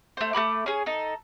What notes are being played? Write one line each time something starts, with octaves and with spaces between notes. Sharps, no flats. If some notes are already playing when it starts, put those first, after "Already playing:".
A3 C5
A3 G#4 B5 D6
C#4 G#4
D#4 A4